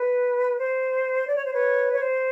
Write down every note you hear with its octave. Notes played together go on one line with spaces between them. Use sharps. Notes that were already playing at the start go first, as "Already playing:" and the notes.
Already playing: B4
C5
D5
C#5
C5
B4 C#5
C#5
C5